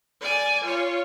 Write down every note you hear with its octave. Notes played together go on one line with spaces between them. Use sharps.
D5 G#5
F4 C#5